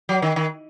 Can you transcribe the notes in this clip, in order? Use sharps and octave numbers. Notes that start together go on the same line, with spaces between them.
F#3
D#3
D#3